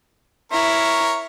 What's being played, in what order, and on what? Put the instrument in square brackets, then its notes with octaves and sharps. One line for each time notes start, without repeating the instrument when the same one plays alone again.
[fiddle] E4 [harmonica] A#4 C#5